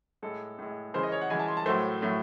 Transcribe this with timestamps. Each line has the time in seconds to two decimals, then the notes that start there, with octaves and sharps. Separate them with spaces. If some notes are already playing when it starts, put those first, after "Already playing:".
0.23 A2 G#3 A4
0.59 A2 G#3
0.94 C#3 E3 G#3 C5
1.03 D#5
1.12 C#5
1.21 F#5
1.30 C#3 E3 G#3 G#5
1.39 A5
1.48 C6
1.57 A5
1.66 A2 F#3 A3 C5
2.02 A2 F#3 A3